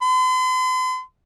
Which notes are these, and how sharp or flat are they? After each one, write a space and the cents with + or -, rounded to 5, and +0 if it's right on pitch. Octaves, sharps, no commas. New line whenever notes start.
C6 -45